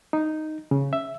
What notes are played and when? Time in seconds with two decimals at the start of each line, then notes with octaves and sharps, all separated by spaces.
0.13 D#4
0.71 C#3
0.93 E5